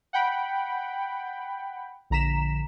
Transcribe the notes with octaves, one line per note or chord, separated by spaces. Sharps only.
F#5 G5 B5
A#1 D3 A#5 B6 E7